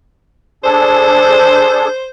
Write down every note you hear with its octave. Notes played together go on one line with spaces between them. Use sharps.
D4 G#4 A4 C5